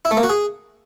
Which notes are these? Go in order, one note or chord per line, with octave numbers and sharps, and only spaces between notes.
E4
A3
A#3
F#4
G#4